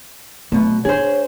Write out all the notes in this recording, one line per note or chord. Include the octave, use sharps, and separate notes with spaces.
B1 B2 A3
D4 G#4 C5 C#5